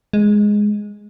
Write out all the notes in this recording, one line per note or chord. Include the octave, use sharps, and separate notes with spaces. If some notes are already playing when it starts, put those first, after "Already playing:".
G#3